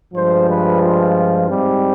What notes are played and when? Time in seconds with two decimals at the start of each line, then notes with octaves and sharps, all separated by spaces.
0.13 G2 F3 G#3 C5
0.47 B4
0.82 F4
1.49 G#2 G3 C4